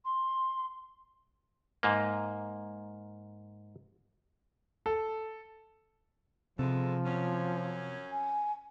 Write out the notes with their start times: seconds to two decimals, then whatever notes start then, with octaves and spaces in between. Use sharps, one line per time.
0.04 C6
1.83 G#2 A#3
4.86 A4
6.59 E2 C3 F3 G#3 A4
7.05 F#2 C#4
8.11 G#5